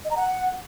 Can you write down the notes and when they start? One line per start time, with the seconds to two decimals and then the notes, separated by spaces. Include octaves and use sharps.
0.05 D#5
0.11 A#5
0.17 F#5